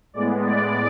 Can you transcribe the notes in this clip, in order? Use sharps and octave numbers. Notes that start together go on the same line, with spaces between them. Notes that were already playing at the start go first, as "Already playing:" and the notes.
A2 G#3 B3 D5
D5